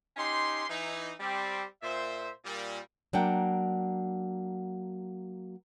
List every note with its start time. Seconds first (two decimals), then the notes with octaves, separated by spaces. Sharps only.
0.17 C#4 D#4 G4 C6
0.70 E3 D#4
1.20 G3 C4
1.83 A#2 C5 E5
2.44 A#2 G3
3.13 F#3 A#3 D4 F#5 G5